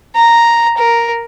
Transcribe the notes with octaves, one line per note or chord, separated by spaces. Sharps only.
A#5
A#4